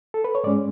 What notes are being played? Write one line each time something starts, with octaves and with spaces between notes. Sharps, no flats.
A4
B4
C#5
G#2 G#3 C#4 D5